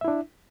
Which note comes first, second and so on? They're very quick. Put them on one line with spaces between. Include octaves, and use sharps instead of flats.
E5 E4 D4